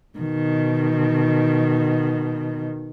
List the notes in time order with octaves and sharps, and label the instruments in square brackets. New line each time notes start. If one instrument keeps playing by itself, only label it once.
[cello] B2 D#3